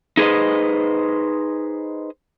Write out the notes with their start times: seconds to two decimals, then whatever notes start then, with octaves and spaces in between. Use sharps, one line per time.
0.17 D#4 G#4 B4 C5 D#5